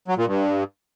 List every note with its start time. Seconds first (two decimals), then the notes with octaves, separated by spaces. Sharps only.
0.08 F#3
0.17 A#2
0.27 G2